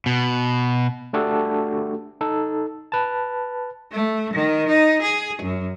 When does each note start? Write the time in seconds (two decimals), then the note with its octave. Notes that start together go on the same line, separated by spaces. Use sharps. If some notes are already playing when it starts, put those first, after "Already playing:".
0.06 B2
1.13 A3 D4 F#4 G4 A4
2.21 D#4 A4
2.92 B4 A5
3.92 A3
4.34 D#3
4.69 D#4
5.02 G#4
5.42 F#2